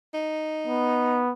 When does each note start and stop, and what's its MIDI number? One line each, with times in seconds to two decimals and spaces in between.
0.14 1.21 63
0.67 1.33 59